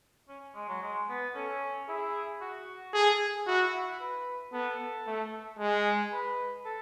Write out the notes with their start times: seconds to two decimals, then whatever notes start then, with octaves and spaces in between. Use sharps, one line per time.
0.28 C#4
0.55 G#3
0.69 F#3
0.83 G#3
1.09 B3
1.35 C#4 A4
1.89 E4 G#4
2.41 F#4
2.94 G#4 A4
3.21 G#4
3.47 E4 F#4
3.61 E4
3.74 E4
3.87 E4
4.00 B4
4.53 B3 A4
5.07 A3
5.59 G#3 G#4
6.12 B4
6.65 A4